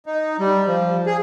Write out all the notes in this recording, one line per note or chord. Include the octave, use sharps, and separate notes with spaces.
D#4
G3
F3
G#4